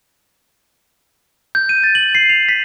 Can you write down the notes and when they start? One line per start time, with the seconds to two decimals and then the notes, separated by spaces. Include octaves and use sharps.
1.55 G6
1.69 D#7
1.84 A6
1.95 F#7
2.15 C7
2.29 F7
2.49 B6